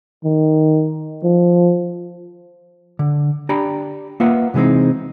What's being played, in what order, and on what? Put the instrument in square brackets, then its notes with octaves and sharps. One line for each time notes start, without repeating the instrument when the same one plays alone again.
[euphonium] D#3
F3
[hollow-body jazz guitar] D3
D4 G4 D5 G5 A#5 B5
A#3 F4 B4 E5 F#5
C3 E3 G#3 C4 D#4